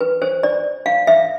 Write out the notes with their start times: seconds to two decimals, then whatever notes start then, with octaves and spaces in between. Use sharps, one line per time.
0.01 B4
0.22 C5
0.43 D5
0.86 F5
1.07 E5